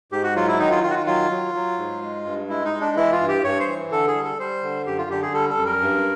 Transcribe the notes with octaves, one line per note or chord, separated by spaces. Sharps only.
G#2 G4
F#4
F#3 F4
E4
D#3 D#4
F4
D#3 F4
F#4
F4
F#3 F4
F#3
F#3
G#2
G#3
G2
G#3 E4
D#4
G#3
D4
E3 E4
F4
G2
G4
G2 C#5
C5
E3
D3 A4
G#4
G3
A4
G3 C5
D3
F#2 G4
F4
D3 G4
G#4
G3 A4
A4
F#2
A#4
G2